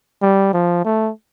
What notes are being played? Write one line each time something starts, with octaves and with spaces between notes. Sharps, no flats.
G3
F3
A3